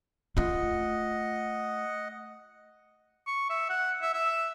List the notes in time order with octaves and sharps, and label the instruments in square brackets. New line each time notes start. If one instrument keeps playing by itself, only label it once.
[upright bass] A3 F4 [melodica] D#5 F#5
[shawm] C#6
E5
F#5
E5
E5